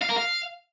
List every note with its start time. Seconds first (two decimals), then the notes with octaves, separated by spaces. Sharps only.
0.02 F5
0.09 A#4
0.16 F5